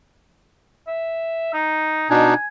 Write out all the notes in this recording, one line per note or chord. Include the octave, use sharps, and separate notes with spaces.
E5
D#4
B2 D4 D#4 G#5